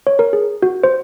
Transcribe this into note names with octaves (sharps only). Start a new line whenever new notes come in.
C#5
A#4
G#4
F#4
C5